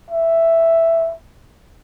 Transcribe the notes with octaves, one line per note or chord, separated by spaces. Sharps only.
E5